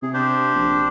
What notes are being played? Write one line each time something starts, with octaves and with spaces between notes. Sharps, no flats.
C3 G#4
D4 G4 C5
A#1